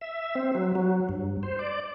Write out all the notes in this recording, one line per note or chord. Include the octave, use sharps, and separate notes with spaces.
E5
C4
F#3
F#3
G2
C5
D5